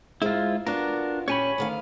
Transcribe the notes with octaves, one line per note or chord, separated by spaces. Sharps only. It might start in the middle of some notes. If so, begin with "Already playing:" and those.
G#2 G#3 E4 F4
B3 D4 F4 F#4 A#4
A#2 C#4 G4 C#5 G#5 B5
D2 D#3 F5